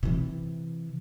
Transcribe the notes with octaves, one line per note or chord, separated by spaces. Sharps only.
C3 E3